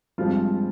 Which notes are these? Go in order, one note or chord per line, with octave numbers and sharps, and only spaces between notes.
G2 F3 G#3 C4 F4